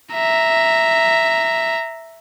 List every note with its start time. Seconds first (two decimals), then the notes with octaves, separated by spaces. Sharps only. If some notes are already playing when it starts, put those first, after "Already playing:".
0.14 E5 A#5